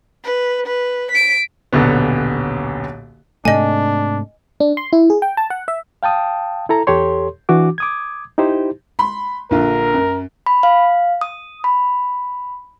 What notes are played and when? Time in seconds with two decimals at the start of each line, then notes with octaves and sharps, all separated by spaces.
0.24 B4
0.66 B4
1.11 B6 D7
1.73 D#1 B1 D3 B3
3.45 G#2 C3 A3 D4 D#5 G#5
4.60 D4
4.77 C6
4.93 E4
5.10 G#4
5.22 G5
5.37 A5
5.50 F#5
5.68 E5
6.03 F5 G5 A5 D#6
6.69 E4 A4 A#5
6.87 E2 G4 A4 C#5 C6
7.49 E3 D4 F#4 D6
7.78 D6 D#6 G#6
8.38 D#4 E4 G4 C5
8.99 B5 C6
9.51 A#1 D3 F4 A#4
9.94 F#2
10.46 B5
10.63 F5
11.21 D#6
11.64 B5